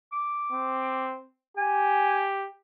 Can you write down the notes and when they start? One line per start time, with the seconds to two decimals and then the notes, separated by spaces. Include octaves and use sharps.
0.12 D6
0.52 C4
1.57 G4 G#5